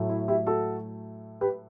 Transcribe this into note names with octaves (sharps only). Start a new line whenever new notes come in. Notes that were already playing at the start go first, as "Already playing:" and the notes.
Already playing: A2 F#3 A3
E4
E4 G4
F#4 A4
G4 B4